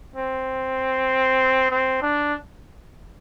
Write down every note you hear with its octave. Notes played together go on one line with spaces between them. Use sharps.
C4
C4
D4